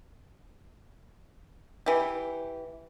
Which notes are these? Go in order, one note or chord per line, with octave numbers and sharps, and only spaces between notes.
E3 G4